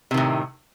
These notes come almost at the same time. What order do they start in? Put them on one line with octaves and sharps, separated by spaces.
C3 D#3 A2